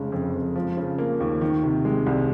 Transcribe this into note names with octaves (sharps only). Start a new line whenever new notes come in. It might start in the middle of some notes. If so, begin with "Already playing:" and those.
Already playing: F1 C#3 G#3
F2
F2
F3
C#3
A#3
D#2
D#3
C3
G#3
C2